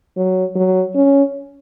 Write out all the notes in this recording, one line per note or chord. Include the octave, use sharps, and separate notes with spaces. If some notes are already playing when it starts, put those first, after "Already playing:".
F#3
F#3
C#4